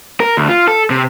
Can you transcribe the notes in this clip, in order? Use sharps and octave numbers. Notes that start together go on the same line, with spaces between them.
A#4
D2
F4
A4
C3